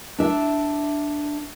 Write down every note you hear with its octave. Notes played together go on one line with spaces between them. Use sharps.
D4 E5